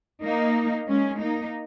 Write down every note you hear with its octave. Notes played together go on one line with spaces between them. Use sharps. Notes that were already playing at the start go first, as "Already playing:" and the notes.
A#3 D#4
G#3 C#4
A#3 D#4